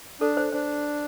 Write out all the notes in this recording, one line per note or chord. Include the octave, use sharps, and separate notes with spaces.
D4 A4
C5
D4 C5